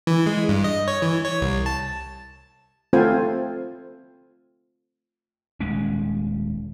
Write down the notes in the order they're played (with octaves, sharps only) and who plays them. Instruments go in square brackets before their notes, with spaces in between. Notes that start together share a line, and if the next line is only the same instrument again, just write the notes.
[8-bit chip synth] E3
G#3
G2
D#5
C#5
E3
C#5
C2
A5
[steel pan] A3 C4 F4 A4 C5 G#5
[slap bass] D#1 G#3 C#4